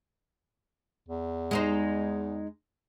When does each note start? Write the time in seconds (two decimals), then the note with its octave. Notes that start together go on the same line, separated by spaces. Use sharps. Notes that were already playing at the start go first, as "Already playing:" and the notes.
1.08 E2
1.51 G#3 D#4 C5